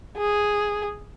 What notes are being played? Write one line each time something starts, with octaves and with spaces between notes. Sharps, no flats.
G#4